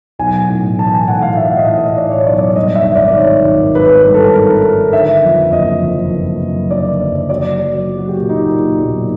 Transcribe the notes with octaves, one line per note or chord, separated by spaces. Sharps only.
B1 G#5
A2
E3 A5
G#5
A2 F#5
F5
A2 E5
D#5
A2
D#5
A2 D5
C#5
B1 D5
D5
G2 D#5
E5
G#1
D5
D#3 C#5
G#1
G#1 B4
G2
A4
D#3 A#4
D#3
D3 E5
F2
F#1 D#5
F2
F#1
F#1
D3 D5
F#1
F#3 D5
F#3
F#3
F#4
G4
A#2
D#4
A#2
B1